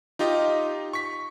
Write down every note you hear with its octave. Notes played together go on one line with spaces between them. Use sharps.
D#4 F4 G4 D#5
C#6 B6